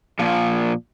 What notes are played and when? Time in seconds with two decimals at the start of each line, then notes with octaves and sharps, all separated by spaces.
0.19 A#2 F3